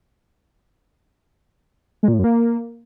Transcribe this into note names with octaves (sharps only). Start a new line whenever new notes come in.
G#3
A#2
A2
F#2
A#3